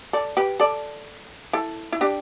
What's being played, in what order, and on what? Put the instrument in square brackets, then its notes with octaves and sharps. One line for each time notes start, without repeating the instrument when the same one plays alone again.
[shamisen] A4 D5
G4 B4
A4 D5
E4 A4
E4
D4 G4